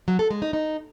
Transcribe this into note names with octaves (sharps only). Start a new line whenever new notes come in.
F#3
A4
G#3
D#4
D#4